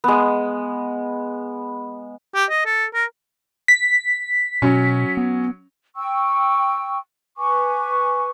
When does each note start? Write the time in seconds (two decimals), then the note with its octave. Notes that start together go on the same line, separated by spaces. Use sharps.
0.04 G#3 B3
2.35 G4
2.50 D#5
2.66 A4
2.94 A#4
3.68 B6
4.62 B2 F#3 C#4
5.17 B3
5.96 G5 C#6 E6
7.38 B4 G#5 C#6 D6